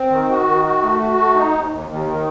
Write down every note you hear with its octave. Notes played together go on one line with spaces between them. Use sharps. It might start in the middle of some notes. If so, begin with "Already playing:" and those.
Already playing: C4
D#3
F#4
D#3
F#4
A3
F#4
A3
D#4
D#2
D#2
D#2
D#3